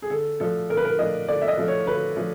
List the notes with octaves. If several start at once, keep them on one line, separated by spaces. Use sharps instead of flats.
G#4
D3 A4
F3 A3 D4 A4
D3 A#4
B4
A#4
F3 A3 D4 D#5
D3 D5
E5
D#5
F3 A3 D4
C#5
D3 B4
F3 A3 D4